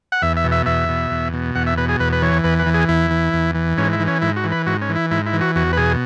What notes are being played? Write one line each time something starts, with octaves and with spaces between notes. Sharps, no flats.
F#5
E2 E5
E5
B2
E5
E2 E5
B2
E2
B2
E2 F#5
E5
B2 B4
G#4
E2 B4
B4
E3 C#5
E2 B4
B4
E3
G#4
E2 E4
E3
E2
E3
G#2 C#4
E4
E3
C#4
G#2 E4
F#4
E3
B4
G#2 F#4
C#4
E3
E4
G#2 E4
E4
E3
F#4
E2 F#4
B4
B2 G#4